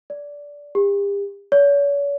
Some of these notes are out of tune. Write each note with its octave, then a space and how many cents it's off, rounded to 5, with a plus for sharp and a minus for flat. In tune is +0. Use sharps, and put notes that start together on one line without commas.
D5 -15
G4 +40
C#5 +40